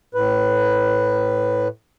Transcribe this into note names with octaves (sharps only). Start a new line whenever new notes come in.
A2 B4